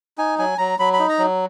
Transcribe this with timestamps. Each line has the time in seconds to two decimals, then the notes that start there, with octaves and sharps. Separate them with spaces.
0.18 D#4 G#5
0.38 F#3 G#5
0.58 F#3 A#5
0.79 F#3 B5
0.93 B5
0.99 D#4
1.09 A#5
1.19 F#3